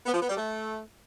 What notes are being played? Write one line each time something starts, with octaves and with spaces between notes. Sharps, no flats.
B3
F3
B3
G3
A3